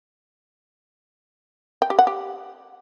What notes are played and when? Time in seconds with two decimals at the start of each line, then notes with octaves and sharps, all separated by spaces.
1.82 G5
1.90 G4
1.99 F#5
2.07 G4